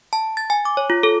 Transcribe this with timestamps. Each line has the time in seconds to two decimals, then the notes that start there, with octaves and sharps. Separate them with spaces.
0.13 A5
0.37 A6
0.50 G#5
0.65 D6
0.77 C#5
0.90 F4
1.03 A4